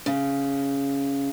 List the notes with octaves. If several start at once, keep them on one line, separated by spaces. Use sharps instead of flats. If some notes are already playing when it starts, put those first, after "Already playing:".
C#3